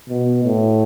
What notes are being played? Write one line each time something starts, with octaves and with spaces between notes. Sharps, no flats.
B2
A2